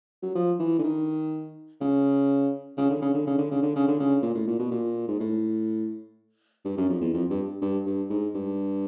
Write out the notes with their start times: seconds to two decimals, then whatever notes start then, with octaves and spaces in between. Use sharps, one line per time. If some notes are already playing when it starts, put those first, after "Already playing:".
0.23 F#3
0.35 F3
0.59 E3
0.79 D3
0.84 D#3
1.81 C#3
2.77 C#3
2.90 D3
3.02 C#3
3.14 D3
3.27 C#3
3.38 D3
3.51 C#3
3.62 D3
3.75 C#3
3.88 D3
4.00 C#3
4.22 A#2
4.35 A2
4.48 A#2
4.59 B2
4.71 A#2
5.08 G#2
5.20 A2
6.65 G2
6.77 F#2
6.89 F2
7.01 E2
7.13 F2
7.30 G2
7.62 G2
7.86 G2
8.10 G#2
8.35 G2